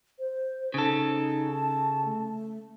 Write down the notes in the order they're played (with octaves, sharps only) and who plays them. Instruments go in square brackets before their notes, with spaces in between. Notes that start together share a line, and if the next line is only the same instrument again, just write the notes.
[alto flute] C5
[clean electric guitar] C#3 A4 [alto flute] D#4
[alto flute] A5
A3